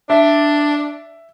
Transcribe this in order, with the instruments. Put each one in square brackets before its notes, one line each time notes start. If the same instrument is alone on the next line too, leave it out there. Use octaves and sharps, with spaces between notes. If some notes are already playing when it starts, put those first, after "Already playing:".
[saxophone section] D4 [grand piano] E5